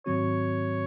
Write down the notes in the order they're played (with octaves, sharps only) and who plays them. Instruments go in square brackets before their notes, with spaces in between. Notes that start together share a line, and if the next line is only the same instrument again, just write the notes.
[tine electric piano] G#2 D#3 F#3 C4 F#4 [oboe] C#5